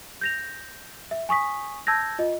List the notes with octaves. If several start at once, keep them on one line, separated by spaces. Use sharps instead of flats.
G6 A#6 F7
E5
G#5 C#6 D#6 B6
A5 E6 G6 G#6 A#6
F4 D#5